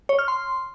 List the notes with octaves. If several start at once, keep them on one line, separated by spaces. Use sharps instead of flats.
C#5
F6
C6